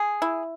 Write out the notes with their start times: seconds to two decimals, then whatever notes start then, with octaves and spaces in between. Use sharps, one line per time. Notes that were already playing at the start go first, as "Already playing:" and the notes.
Already playing: G#4
0.22 E4